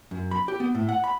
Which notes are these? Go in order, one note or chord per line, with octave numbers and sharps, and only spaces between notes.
F#2
B5
G4
B3
A2
F#5
B5